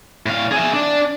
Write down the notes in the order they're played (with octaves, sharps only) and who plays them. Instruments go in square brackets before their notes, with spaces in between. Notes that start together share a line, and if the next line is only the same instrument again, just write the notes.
[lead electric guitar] A2 F5
G#4 E5
D4